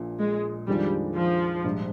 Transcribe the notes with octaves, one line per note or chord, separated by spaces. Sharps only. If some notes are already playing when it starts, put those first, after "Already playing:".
Already playing: A#1 A#2 F3
G#3
F2 D#3 G3 G#3 D4 F4
F3
A#1 G#2 G3 D4